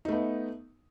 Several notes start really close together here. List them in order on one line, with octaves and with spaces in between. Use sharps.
D#4 A3 B3